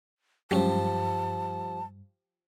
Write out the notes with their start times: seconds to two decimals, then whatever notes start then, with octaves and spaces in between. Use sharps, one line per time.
0.51 G2 F3 F#3 G#3 C#4 G4 A5